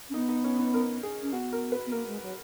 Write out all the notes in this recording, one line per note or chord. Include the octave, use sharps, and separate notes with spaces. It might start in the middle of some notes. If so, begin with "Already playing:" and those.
C#4
B3 D#4
D#4
C#4
D#4
A#4
G#4
C#4
B3 F#4
A#4
B4
B3
A#3 A#4
G#3
F#3